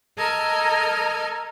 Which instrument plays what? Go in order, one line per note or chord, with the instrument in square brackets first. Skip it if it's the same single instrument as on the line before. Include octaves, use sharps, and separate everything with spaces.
[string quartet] A4 A#4 D#5 A#5 F6 G#6